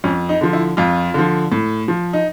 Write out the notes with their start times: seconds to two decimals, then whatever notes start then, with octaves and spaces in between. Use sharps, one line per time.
0.04 F2 C#4
0.29 D#4
0.41 D3 F3
0.53 E4
0.77 F2 F4
1.14 D3 F3
1.52 A2
1.88 F3
2.13 D#4